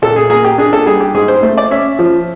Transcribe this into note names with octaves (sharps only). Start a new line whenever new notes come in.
A#2 A4
G#4
A#3 G#4
G4
D4 G#4
A4
G3 G#4
G4
G#2 G#4
C5
A3 C5
D5
C#4 E5
F3